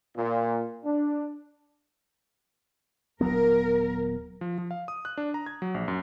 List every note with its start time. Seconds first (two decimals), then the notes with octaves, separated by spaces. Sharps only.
0.16 A#2
0.85 D4
3.21 D#1 F#3 B3 A#4
4.41 F3
4.58 F3
4.71 F5
4.88 D#6
5.05 F#6
5.17 D4
5.34 A#5
5.46 G#6
5.62 F#3
5.74 A#1
5.88 F#2